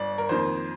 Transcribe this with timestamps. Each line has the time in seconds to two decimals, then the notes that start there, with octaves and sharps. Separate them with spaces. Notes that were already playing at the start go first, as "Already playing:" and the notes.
Already playing: G1 D5
0.18 A#4
0.29 F2 D#3 A#3 C5